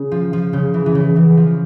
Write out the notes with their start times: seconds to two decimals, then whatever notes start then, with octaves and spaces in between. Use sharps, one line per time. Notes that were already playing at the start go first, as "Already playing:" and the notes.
Already playing: C#3
0.12 F3
0.33 F3
0.53 C#3
0.74 E3
0.86 E3
0.95 C#3
1.16 E3
1.37 F3